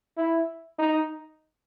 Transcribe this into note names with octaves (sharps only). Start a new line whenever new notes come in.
E4
D#4